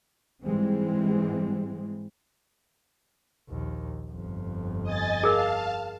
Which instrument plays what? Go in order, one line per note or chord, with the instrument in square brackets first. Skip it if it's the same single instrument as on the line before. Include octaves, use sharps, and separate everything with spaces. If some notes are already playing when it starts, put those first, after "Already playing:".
[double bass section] G#2 E3 G3 G#3 C4
[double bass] A#1 D#2
G1 F2
[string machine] D#5 G#5 A6
[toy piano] G#4 A#4 [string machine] F5 A5